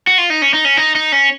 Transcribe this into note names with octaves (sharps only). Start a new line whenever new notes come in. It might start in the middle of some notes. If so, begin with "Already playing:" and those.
F#4
F4
D#4
C#4
D#4
C#4
D#4
D#4
C#4